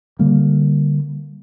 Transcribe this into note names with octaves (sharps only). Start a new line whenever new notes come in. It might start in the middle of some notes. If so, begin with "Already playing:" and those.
D3 G3 A#3